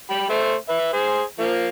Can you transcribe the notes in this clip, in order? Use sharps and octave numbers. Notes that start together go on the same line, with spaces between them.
G4 B5
A3 C5 E5
B4 E5
G#4 C5
F3 A#3